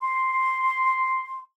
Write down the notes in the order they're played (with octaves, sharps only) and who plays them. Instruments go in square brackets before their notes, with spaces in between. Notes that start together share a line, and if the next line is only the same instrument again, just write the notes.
[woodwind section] C6